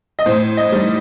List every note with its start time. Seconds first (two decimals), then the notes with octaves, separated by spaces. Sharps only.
0.19 D#5
0.26 A2 C5
0.57 D#5
0.72 G3 D#4